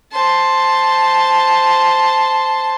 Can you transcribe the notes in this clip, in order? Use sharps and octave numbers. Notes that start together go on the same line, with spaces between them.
C5 A5